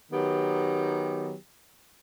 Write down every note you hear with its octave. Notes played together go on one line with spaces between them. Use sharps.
D#3 F#3 B3 G4